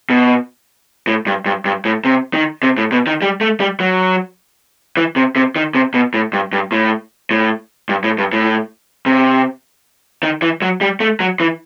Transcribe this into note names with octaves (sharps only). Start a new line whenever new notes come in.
B2
A2
G2
G2
G2
A2
C3
D#3
C3
A2
B2
D#3
G3
A3
G3
F#3
E3
C3
C3
D#3
C3
B2
A2
G2
G2
A2
A2
G2
A2
G2
A2
C3
D#3
E3
F#3
G3
A3
F#3
E3